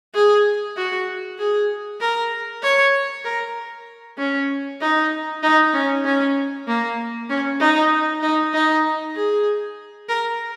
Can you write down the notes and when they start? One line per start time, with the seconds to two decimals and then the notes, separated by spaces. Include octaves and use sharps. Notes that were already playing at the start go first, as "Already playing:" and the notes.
0.14 G#4
0.76 F#4
1.39 G#4
2.01 A#4
2.62 C#5
3.24 A#4
4.18 C#4
4.81 D#4
5.43 D#4
5.74 C#4
6.04 C#4
6.67 A#3
7.29 C#4
7.60 D#4
8.22 D#4
8.54 D#4
9.15 G#4
10.09 A#4